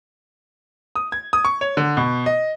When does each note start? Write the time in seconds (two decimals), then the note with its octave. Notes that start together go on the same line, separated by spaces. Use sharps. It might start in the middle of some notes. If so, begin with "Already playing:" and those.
0.96 D#6
1.12 G#6
1.33 D#6
1.45 C#6
1.61 C#5
1.77 D3
1.97 B2
2.26 D#5